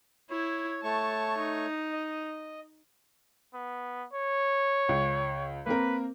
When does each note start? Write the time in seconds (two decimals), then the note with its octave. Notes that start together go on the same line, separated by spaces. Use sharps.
0.30 E4 C#5
0.84 A3 C#5 A5 C#6
1.38 D#4
1.92 D#5
3.54 B3
4.13 C#5
4.89 C#2
5.66 A#3 C4 A#4 B4